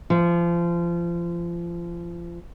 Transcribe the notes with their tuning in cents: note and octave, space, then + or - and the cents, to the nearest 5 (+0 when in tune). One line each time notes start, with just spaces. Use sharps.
F3 -30